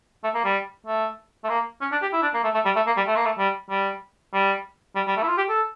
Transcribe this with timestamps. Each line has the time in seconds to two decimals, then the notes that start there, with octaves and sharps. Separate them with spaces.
0.24 A3
0.35 A#3
0.44 G3
0.87 A3
1.44 A3
1.49 A#3
1.81 C#4
1.92 D4
2.02 G4
2.13 E4
2.23 D4
2.34 A#3
2.44 A3
2.54 A3
2.65 G3
2.76 A3
2.87 A#3
2.97 G3
3.07 A3
3.16 A#3
3.25 A3
3.38 G3
3.70 G3
4.34 G3
4.96 G3
5.07 G3
5.17 A3
5.23 E4
5.28 F4
5.38 G4
5.49 A4